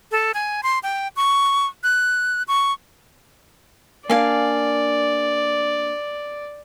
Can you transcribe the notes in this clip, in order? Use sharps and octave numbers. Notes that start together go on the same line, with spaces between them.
A4
G#5
C6
G5
C#6
F#6
C#6
A#3 D4 D5 F5 G#5